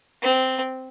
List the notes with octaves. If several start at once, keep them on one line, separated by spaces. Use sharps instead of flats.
C4